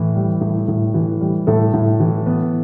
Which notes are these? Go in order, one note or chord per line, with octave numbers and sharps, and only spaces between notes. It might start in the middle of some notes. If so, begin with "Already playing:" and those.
Already playing: A2 E3
G3
A2
A2
E3
G3
A2 A4
A2
E3
B3